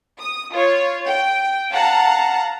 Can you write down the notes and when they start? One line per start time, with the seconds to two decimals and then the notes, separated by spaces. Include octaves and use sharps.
0.20 D#6
0.52 F4 C#5
1.06 G5
1.72 F5 F#5 A5 A#5